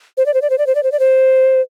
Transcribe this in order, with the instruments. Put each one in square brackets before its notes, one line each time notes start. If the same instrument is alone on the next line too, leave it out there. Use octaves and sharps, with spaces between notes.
[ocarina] C5
D5
C5
D5
C5
D5
C5
D5
C5
D5
C5